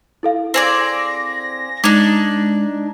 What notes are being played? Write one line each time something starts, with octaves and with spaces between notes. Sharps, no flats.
E4 A4 F5
C4 G#4 D5 A#6
G#3 D4 D#4 D6 G#6 F7